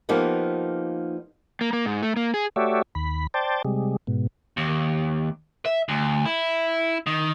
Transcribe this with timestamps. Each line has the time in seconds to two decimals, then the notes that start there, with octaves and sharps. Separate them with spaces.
0.09 F3 A#3 B3 D#4 G4 F#5
1.61 A#3
1.73 A#3
1.86 G#2
2.03 A3
2.16 A#3
2.34 G#4
2.56 A3 F#4 G4 C#5 D5 E5
2.95 D#2 B5
3.34 C5 D5 G5 A5
3.65 C3 G3 G#3
4.07 G#2 B2
4.57 D#2
5.65 E5
5.89 D2
6.25 E4
7.06 D#3